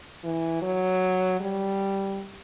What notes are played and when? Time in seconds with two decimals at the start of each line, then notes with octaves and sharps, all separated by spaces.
0.24 E3
0.62 F#3
1.40 G3